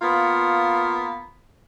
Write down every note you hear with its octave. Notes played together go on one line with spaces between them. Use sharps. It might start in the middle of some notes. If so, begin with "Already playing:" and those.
A#3 B3 F4